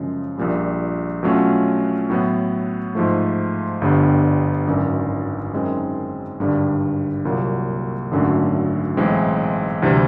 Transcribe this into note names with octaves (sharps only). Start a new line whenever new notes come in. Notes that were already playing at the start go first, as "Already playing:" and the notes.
Already playing: F#2 C#3 F3 G#3
A#1 A#2 G3
B2 F#3 A3 C#4 F4
A2 F#3 B3
G#2 F3 A3
G1 G2 D3 G3 B3
G#1 F#2 D3
F#2 D#3 G#3 C4 E4
G#1 G2 D3 G3
C2 A#2 F#3 A#3
G#1 F#2 D3 F#3 A3
B1 A2 E3 G#3 C4
D2 C3 E3 G3